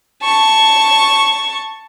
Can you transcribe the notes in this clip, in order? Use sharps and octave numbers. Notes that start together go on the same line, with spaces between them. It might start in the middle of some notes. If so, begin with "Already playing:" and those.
A5 C#6